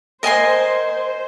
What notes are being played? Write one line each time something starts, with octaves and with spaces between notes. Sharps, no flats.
A#4 C5 D#5 G#5 C6
C5